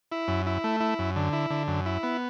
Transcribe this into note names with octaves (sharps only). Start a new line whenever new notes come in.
E4
F#2
E4
A3
E4
F#2
D3
E4
D3
F#2
E4
B3